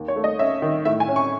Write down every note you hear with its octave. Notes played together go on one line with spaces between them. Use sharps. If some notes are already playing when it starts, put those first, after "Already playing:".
Already playing: D#2
C#5
A3
D#5
C#4 E5
D#3
A2 E5
G#5
C#4
C#6